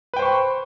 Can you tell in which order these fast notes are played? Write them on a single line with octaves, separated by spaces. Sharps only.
B4 G5 C5 C#6 C6